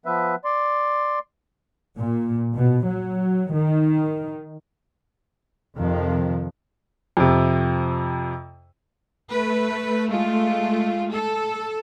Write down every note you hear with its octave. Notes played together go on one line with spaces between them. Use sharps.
F3 B3 B4 E5
D5 C6
A#2
B2
F#3
D#3
F2 C3 D#3 F3
F2 C3
A3 B4
G#3 F4
A4